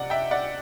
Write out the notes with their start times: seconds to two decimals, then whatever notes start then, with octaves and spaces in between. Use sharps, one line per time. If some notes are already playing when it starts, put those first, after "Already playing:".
Already playing: C3 D5 F#5
0.10 E5 G5
0.31 D5 F#5